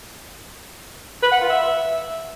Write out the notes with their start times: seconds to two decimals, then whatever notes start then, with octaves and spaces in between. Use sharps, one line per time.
1.23 B4
1.32 F#5
1.41 F4
1.50 E5